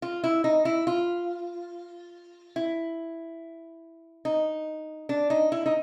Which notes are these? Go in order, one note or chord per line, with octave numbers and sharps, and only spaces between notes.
F4
E4
D#4
E4
F4
E4
D#4
D4
D#4
E4
D#4